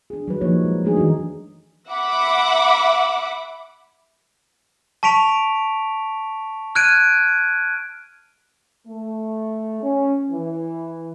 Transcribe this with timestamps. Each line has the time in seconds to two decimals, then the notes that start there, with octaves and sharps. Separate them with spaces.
0.10 D4 G#4
0.28 F#3 G3 B4
0.41 F3 A#3 D#4 C#5
0.65 G#3
0.84 G#3 A3 D4 D#4 G#4
0.96 D#3 E3 F#3 D4 F#4
1.90 E5 F#5 B5 D6
5.03 A5 C#6 B6 D7 F7
6.75 F6 F#6 G#6 D7 D#7
8.87 A3
9.83 C#4
10.30 E3